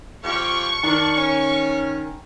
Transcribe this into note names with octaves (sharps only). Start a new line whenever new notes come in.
F2 G4 F5 C#6
D#3 D4 A#4
C#4